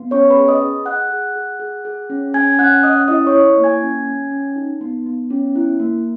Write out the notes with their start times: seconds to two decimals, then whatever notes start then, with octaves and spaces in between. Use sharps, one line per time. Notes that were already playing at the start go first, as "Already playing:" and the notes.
Already playing: B3
0.11 C#4 C#5 C#6
0.30 B4 B5
0.37 G#4
0.48 D#5 D#6
0.61 G#4
0.86 G#4 F#5 F#6
1.10 G#4
1.36 G#4
1.60 G#4
1.85 G#4
2.10 C#4
2.34 C#4 G#5 G#6
2.59 C#4 F#5 F#6
2.83 C#4 D#5 D#6
3.08 E4 D#5 D#6
3.27 C#5 C#6
3.33 E4
3.58 A#3
3.64 G#5 G#6
3.82 C#4
4.07 C#4
4.31 C#4
4.56 D#4
4.81 B3
5.06 B3
5.30 C#4
5.55 E4
5.80 A#3